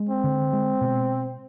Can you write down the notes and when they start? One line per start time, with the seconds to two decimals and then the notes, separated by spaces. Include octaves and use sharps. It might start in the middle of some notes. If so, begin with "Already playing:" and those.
Already playing: G#3
0.09 C4
0.24 D3
0.53 G#3
0.81 B2